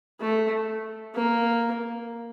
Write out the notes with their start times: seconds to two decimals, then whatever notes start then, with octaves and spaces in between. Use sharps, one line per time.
0.20 A3
1.15 A#3